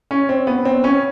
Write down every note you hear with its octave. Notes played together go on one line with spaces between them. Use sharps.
C#4
C4
B3
C4
C#4